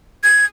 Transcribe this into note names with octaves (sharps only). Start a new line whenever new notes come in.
G#6